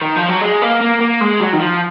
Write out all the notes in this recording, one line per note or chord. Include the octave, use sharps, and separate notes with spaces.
D#3
F3
F#3
G#3
A#3
A#3
A#3
G#3
F#3
D#3
F3